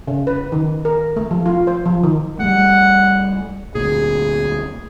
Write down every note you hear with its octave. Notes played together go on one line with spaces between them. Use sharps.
C#3
B4
D#3
A#4
A3
F3
F4
C5
F3
D#3
G3 A3 F#5
D2 A#2 G#4